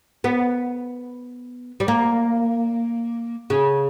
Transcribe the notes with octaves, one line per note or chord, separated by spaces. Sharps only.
B3
G3
A#3
C#3